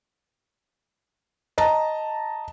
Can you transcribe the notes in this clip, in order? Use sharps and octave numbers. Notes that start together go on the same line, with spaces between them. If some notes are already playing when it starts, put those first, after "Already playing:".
D#5 A5 A#5